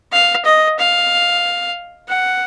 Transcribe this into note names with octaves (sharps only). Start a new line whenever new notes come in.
F5
D#5
F5
F#5